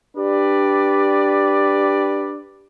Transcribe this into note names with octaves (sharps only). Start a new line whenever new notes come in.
D4 G4 B4 D5